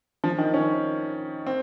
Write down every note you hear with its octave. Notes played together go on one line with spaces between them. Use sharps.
F3
D#3
C#4
C4